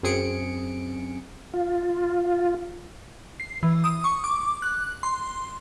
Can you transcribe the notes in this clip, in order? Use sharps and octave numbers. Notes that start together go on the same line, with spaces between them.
F#2 C4 G#4 C#7 D7
F4
C7
E3
D#6
C#6
D6
F#6
C6